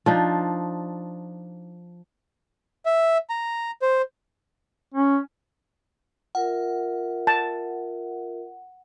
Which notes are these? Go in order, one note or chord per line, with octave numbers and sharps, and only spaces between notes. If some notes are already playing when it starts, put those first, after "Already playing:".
F3 D4 D#4
E5
A#5
C5
C#4
F4 A#4 E5 F#5
A5